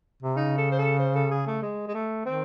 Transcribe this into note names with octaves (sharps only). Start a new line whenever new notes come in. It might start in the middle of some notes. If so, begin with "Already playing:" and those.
C3
C#3 D#4
A4
C5
A4
C5
A4
G#4
A3
G#3
G#3
A3
D#3 C4